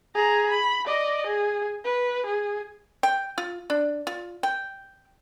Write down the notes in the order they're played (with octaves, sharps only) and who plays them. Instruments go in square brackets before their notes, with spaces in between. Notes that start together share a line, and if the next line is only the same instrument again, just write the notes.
[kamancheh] G#4 A#5
B5
D5 D#5
G#4
B4
G#4
[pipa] G5
F4
D4
F4
G5